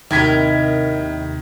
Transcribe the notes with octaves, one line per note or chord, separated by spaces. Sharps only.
D#2 A2 C3 D#3 A#4 D#5 G#6 B6